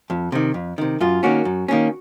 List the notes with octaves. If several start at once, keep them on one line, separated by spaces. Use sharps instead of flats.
F2
C3 D#3
F2
C3 D#3
F#2 F4
D#3 A#3 C#4 F#4
F#2
D#3 A#3 C#4